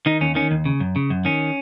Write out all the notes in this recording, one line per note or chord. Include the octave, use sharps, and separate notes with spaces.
D#3 D#4
D#2 C#4
D#3 C#4
D#2
C#3
F#2
C#3
F#2
D#3 C#4